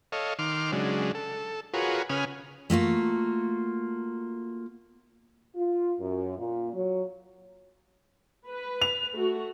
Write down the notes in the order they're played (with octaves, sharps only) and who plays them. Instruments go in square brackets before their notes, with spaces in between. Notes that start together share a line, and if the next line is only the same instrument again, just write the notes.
[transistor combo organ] A4 C#5 D#5 F5
D#3 C6 D6 F6
C#3 F#3 G#3 D4
A4
F4 F#4 G#4 A#4 B4 C#5
C#3 C#4 B4 G#5 D#6 F6
[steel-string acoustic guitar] A3 A#3 F4 F#4
[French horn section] F4
F#2
A#2
F#3
[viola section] B4
[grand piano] F7
[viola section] A3 F#4